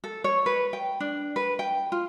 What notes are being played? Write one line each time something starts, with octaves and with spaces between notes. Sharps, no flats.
A4
C#5
B4
G5
D4
B4
G5
F4